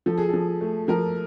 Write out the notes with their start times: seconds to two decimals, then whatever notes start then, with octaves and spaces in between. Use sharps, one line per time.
0.06 F3 A4
0.18 G#4
0.29 F3 A4
0.61 A3
0.88 F3 A#4